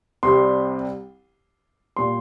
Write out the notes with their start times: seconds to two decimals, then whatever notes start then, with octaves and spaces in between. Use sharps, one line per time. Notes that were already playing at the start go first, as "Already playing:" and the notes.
0.23 C2 C3 G3 C6
1.96 A#2 G3 C6